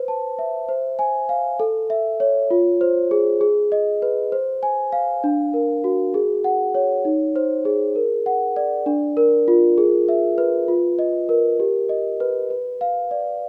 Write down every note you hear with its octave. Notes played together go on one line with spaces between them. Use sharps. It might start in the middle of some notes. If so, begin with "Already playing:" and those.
Already playing: B4 C5
A5
E5
C5
G#5
F5
A4
E5
C#5
F4
C5
G#4
G#4
D#5
B4
C5
G#5
F5
D4
A#4
F#4
G#4
F#5
C#5
D#4
C5
G#4
A#4
F#5
D5
D4
A#4
F4
G#4
E5
B4
F4
D#5
A#4
G4
D#5
B4
B4
F5
D5